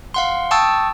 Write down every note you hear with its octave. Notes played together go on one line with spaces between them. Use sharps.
F5 F#5 C6
G5 A5 C#6 D#6 E6 A6